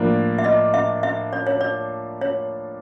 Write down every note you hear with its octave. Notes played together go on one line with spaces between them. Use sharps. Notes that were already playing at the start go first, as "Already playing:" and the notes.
Already playing: A2 F3 A#3 D4
E5
D#5
E5
E5
D5
C#5
D5
C#5